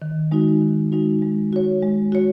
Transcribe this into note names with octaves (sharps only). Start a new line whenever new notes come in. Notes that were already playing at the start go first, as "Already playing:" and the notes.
D#3
G#3 D#4 F#4
D#3
G#3 D#4 F#4
G#3
F#4 C#5
G#3
F#4 C#5